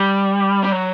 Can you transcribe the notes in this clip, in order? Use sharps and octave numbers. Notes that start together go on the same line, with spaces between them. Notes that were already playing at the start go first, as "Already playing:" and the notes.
Already playing: G3
G3
F#3